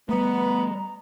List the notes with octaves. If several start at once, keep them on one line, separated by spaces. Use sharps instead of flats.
G3 A3 B3 A#5